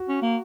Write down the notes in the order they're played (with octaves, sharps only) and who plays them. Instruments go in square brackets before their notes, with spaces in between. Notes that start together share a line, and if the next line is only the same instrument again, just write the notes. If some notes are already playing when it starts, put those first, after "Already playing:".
Already playing: [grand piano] F#4
[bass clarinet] C#4
A#3